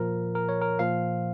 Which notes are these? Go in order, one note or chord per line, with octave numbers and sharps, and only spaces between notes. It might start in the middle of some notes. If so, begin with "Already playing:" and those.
Already playing: A#2 F3 A#4
A#4
C#5
A#4
A#2 F3 F5